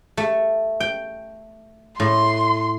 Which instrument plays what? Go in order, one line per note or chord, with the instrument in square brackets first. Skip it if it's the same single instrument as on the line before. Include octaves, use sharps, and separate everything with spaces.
[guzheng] A3
G5
[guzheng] A2 [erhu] C6